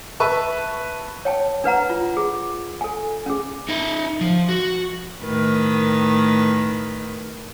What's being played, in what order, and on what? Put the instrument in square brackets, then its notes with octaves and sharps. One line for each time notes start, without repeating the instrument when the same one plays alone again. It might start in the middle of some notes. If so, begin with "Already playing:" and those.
[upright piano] B4 E5 A5 C#6
[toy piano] C#5 G5 A5
D4 B4 F#5 A#5
F4
G#4
A4 G#5
C#4 G#4
[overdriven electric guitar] D#4 E5
F3
F#4
[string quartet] A2 D#3 B4